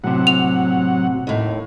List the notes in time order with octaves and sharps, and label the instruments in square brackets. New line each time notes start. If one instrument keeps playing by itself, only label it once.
[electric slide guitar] A2 C3 [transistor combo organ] F#3 F#5
[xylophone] F7
[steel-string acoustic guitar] D#2 A2